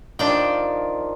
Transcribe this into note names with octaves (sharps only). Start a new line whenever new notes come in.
D#3 F3 D4 D5 G5